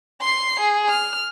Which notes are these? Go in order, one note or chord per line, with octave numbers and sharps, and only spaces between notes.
C6 C7
G#4
F6